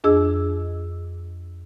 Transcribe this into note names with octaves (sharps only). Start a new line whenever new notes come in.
F2 D4 G#4 D#5 E6